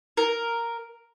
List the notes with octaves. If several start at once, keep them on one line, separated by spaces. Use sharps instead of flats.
A#4